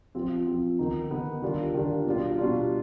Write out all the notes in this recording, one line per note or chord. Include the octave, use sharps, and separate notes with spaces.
F3 C4 F4
F3 C4 F4
D#3 B3 D#4
D#3 B3 D#4
D#3 G3 D4 F4
D#3 G3 D4 F4
B2 G3 D4 F4
B2 G3 D4 F4